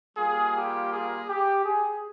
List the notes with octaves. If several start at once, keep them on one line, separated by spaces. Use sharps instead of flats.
G3 A#3 F4 G#4
G4
G#4
G4
G#4